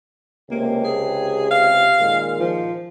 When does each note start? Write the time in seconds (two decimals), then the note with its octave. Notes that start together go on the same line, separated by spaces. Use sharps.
0.51 C#2 C3 A#3 G4
0.84 G#4
1.51 F5
1.99 A#2 D#3 G#3
2.39 F3